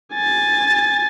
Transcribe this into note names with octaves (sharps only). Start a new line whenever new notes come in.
G#5 A6